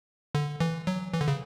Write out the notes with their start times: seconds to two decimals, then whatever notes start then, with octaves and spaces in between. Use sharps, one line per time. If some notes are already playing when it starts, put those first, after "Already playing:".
0.35 D3
0.60 E3
0.87 F#3
1.13 E3
1.21 D3
1.28 C#3